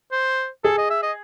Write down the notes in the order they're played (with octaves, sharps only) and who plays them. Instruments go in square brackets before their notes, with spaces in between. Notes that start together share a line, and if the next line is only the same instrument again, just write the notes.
[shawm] C5
[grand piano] G#4 [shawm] A4
[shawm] D#5
E5
D#5